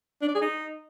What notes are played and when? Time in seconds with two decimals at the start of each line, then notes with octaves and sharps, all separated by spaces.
0.22 D4
0.28 D5
0.35 G#4
0.42 D#4